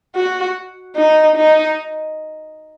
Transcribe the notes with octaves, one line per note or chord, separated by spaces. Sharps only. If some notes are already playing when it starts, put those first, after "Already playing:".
F#4
D#4
D#4